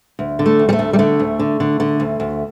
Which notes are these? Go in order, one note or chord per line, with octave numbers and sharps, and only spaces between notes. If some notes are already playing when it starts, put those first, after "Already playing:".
D2
D3
A3
D2
G3
A3
D2
G3
D3 A3
D2
D3
D3
D3
D2
D2